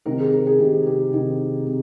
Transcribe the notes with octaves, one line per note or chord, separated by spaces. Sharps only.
C3 D#3 A#4
G#4
A#4
G#4
C3 D#3 G4
G4
C3 D#3
C3